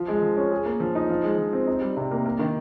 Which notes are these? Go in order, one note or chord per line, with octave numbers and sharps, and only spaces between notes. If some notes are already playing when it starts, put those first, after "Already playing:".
Already playing: F3
G#3
F3
C#4
G#4
A#3
F3
D#4
F3
G#3
F3
C4
D#4
G3
C3
A#3
A#3
D#3